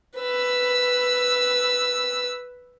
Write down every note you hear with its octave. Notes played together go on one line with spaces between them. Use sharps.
B4 E6